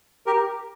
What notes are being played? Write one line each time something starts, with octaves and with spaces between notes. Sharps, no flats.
G4 A#4